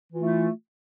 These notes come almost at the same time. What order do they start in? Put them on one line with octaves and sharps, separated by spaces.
E3 F4 E4 A3